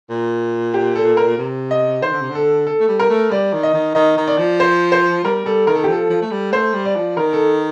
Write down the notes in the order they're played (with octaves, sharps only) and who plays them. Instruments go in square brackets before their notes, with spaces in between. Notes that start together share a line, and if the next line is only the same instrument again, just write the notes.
[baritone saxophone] A#2
[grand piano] G4
A4
A#4
[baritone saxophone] C3
[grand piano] D#5
[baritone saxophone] D#3 [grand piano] C5
[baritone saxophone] D3
C3
D3
[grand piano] A4
A4
[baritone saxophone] A3
G3
[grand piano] A#4
[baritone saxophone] A3
[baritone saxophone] G3 [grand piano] D5
[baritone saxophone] D#3
[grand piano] D#5
[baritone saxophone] D#3
[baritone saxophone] D#3 [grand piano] D#5
[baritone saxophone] D#3
[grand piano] D5
[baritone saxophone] F3
[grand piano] C5
C5
[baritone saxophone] G3 [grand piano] A#4
[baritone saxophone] G3 [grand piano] A4
[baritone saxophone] D#3 [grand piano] A#4
[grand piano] A4
G4
[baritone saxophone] F3 [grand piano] A4
[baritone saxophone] F3
A3
G3
[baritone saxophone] A3 [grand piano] C5
[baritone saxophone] G3
[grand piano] D5
[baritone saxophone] F3
[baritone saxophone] D#3 [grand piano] A#4
[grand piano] A4